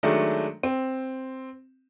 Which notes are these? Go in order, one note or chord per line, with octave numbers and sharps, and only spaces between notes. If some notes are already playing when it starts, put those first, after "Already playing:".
D#3 F#3 G#3 A3 D4
C4